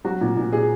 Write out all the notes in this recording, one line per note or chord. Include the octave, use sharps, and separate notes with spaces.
F#3 F#4
A#2
A#2
A#2 G#4